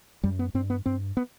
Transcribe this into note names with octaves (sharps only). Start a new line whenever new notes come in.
F#2 G3
B3
G2 C4
B3
G2 C4
B3